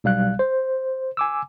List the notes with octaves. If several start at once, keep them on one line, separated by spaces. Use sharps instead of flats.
B1 G3 F5 F#6
C5
G#5 D6 E6